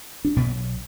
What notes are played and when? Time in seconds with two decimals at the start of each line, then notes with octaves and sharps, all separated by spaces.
0.25 D4
0.36 B1 B2 B3